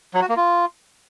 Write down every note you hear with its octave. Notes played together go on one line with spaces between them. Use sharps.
F#3
F#4
A#3
F4